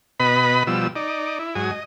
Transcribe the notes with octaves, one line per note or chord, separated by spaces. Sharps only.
B2 B4 D#5 B5
B2 F3 G3 E6
D#4 D5
E4
G#2 F#3 G#5 D#6
D#5